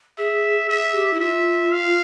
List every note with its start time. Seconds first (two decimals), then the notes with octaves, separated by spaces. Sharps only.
0.18 G#4 E5
0.69 G#4 E5
0.95 G4
1.13 E4
1.20 F4 E5
1.72 F5